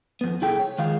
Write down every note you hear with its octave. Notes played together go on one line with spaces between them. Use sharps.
F2 B3
C2 E4 G#4 A4 G5
C#5
D#3 F3 G#3 F5